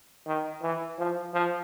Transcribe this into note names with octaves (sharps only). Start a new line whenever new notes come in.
D#3
E3
F3
F3